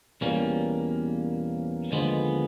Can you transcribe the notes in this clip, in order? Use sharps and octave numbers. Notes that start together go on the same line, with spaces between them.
E2 B2 G3 A#3 C#4
D#2 D3 F3 G#3 B3